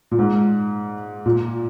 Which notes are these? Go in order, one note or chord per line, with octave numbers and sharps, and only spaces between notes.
A#2
G#2
A#2